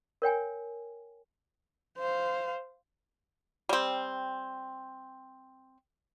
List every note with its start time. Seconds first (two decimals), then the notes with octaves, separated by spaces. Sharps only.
0.22 A#4 C#5 G5 G#5
1.98 C5 F5
3.69 G3 C4